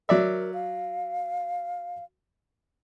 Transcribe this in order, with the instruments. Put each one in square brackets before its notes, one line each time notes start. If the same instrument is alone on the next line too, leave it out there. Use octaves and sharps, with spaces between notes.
[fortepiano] F#3 D5 E5 [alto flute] A#4
[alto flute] F5